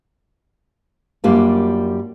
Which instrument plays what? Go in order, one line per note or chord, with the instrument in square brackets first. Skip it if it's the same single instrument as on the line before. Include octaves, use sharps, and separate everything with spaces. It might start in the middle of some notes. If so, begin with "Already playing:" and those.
[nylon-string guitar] F#2 G3 A#3 D4 F4